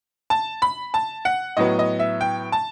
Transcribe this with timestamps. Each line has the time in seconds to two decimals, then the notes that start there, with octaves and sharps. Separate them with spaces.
0.30 A5
0.62 B5
0.94 A5
1.25 F#5
1.57 A2 F#3 B3 D#5
1.79 D#5
1.99 E5
2.21 G5
2.52 A5